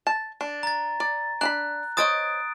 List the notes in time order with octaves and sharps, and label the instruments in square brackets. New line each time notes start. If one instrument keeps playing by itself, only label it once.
[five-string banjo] A5
D4
[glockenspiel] A#5 A6
[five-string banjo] D5
[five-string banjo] D4 A#5 B5 [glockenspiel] F#6
[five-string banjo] C5 C#5 D#5 [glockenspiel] D#6 A6 D7